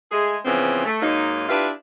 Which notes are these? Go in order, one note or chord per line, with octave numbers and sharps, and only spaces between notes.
G#3 A3 G#4
C#3 E3 F3 B3 C4
A3
G#2 F#3 A#3 D#4
D4 E4 F4 G4 B4